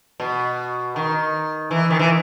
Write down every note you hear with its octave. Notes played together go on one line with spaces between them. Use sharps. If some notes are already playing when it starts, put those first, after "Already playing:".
B2
D#3
E3
D#3
E3